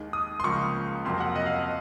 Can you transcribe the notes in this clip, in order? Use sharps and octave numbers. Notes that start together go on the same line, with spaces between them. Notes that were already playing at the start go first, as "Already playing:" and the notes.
Already playing: D#2 D#3 G#3
D#6
C6
C#2 C#3 F3 A#3 C#6
F2 C3 F#3 A#3 C6
F#5
D#5
F5
D#5